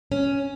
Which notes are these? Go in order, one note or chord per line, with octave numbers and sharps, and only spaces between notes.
C#4